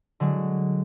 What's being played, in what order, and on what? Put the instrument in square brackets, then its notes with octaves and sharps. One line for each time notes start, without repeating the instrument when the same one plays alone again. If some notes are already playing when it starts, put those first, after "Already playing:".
[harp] D3 F#3 G#3